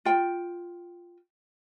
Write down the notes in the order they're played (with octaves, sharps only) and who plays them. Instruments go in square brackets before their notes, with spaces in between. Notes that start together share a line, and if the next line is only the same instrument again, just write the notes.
[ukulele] F4 G5